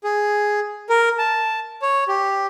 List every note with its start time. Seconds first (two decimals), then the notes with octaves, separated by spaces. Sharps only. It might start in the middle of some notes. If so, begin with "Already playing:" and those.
0.04 G#4
0.89 A#4
1.19 A5
1.82 C#5
2.08 G4